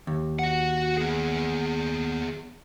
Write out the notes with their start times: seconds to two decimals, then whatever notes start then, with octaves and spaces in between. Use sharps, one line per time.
0.07 D#2
0.39 F#4 F#5
0.97 B3 G#4